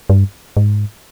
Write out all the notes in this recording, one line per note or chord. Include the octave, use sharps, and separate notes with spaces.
G2
G#2